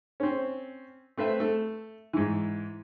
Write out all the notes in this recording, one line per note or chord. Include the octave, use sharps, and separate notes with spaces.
C4 C#4
A3 C4 B4 E5
A3
G#2 E3